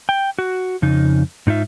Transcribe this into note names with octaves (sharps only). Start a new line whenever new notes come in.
G5
F#4
F2 C#3 D#4
G#2 D#4 F4 E5